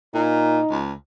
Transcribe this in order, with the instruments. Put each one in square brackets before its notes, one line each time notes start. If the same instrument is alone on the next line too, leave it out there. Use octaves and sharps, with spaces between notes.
[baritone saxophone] A#2 [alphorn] D#4
[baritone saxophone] C#2